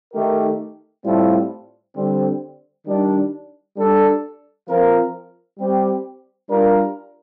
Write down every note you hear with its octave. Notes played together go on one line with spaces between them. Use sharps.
D#3 A3 D#4 G4 A#4
A2 G3 C4 F4 A4
D3 G3 C4
D#3 G3 D4
G3 D4 A4
F3 C4 F4 A#4
G3 C4 G4
G3 D4 F4 A#4